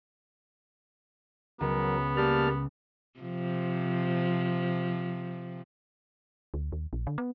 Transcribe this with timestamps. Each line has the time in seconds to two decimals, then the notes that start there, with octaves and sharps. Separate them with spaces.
1.61 C#2 F#3 B3 A#4
2.17 G3 A#3 A5 F6
3.20 C3 F3
6.54 D2
6.72 D#2
6.93 A#1
7.07 D3
7.18 B3